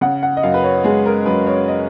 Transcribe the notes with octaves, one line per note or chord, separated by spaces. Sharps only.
C#3 F#5
F#5
D#5
F#2 F5
B4
C#5
G#3 G#4
A#4
F#2 B4
C#5
D#5